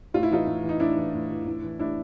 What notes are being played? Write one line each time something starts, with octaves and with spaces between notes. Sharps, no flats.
A2 F4
E4
E3 D#4 F4
A2
E3
D#4
A2 D4 E4
E3
A2
E3
A2
E3
A2 D4 E4